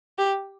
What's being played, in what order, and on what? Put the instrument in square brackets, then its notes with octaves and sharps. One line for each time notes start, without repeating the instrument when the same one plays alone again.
[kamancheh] G4